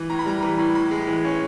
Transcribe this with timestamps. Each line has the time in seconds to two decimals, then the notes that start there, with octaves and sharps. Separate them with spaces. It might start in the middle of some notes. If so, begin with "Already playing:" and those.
Already playing: E3
0.10 A2 A#5
0.19 B5
0.26 G3 A#5
0.43 E3
0.58 A2
0.75 A2 B5
0.91 G#3
1.07 E3
1.25 C#4